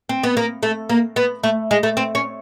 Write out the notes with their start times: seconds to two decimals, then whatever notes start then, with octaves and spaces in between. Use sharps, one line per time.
0.09 C4
0.23 B3
0.37 A#3
0.63 A3
0.89 A#3
1.16 B3
1.44 A3
1.71 G#3
1.83 A3
1.97 C4
2.15 C#4